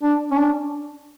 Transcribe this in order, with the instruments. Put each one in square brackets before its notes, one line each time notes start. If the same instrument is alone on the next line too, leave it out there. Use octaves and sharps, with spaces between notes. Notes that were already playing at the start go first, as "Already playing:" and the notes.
[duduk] D4
C#4
D4